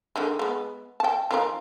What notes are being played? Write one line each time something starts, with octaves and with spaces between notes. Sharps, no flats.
D3 D#3 G#3
G#3 B3
G5 A5
D#3 F3 A#4